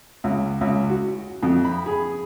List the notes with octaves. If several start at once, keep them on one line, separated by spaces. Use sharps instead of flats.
C#2
C#2
F#4
F2
B5
G#4